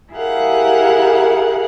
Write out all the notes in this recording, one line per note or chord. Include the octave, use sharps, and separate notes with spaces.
E4 G4 G#4 A#4 F5 F#5